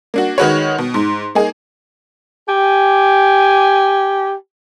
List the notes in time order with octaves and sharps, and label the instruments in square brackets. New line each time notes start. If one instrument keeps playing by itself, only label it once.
[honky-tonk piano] A#3 D4 F#4
D#3 G#3 F#4 B4 C#5
B2
G#2
A#3 D#4 G#4
[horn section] G4 G#5